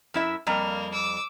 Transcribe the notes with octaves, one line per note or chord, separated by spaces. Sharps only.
F#2 E4 E5
F2 G3 A#3 A#5
D6 E6